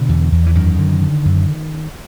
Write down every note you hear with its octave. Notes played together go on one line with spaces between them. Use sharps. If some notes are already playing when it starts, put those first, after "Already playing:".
Already playing: B2 D3
E2
E2
E3
F#2 D#3
D3
D3
F#2